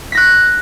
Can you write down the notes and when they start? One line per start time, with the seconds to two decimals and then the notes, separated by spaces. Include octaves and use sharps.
0.12 B6
0.15 A#6
0.17 F#6